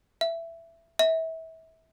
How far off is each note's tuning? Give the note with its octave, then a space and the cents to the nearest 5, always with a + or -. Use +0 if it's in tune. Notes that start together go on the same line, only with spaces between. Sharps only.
E5 +15
E5 -30